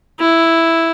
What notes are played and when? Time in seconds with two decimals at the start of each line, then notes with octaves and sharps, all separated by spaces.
0.20 E4